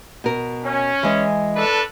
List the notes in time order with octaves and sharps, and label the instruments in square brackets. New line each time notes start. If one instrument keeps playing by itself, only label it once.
[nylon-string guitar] B2 A#4
[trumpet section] C#4
[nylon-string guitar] E3 G#3 D#5
[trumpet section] D4 A4 B4